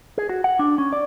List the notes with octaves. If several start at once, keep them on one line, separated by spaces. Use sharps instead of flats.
G#4
F#4
F#5
D4
C#4
D5